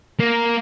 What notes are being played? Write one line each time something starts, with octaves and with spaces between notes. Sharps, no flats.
A#3